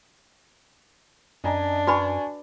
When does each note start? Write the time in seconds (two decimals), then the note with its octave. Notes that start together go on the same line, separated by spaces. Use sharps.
1.44 F#2 D4 D#5 G#5 A#5
1.87 F#4 B4 G#5 B5 C#6